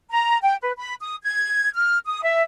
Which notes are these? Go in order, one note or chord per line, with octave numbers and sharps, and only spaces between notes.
A#5
G5
B4
B5
D#6
G#6
F6
D#6
E5